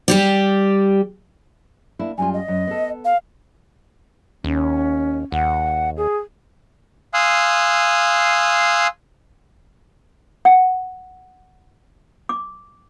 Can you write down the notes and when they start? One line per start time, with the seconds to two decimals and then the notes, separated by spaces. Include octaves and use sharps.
0.08 G3 G4 D5
1.99 A#3 D4 E4
2.18 F#2 G3 F4 G#5
2.33 D#5
2.48 F#2
2.67 B3 A4
3.04 F5
4.44 D#2 C#4
5.32 D#2 F#5
5.97 G#4
7.14 F5 G#5 C6 D#6 E6 F#6
10.45 F#5
12.29 D6